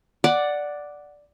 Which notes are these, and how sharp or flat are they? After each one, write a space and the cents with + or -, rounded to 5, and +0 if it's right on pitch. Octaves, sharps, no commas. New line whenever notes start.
D5 +0 F#5 +0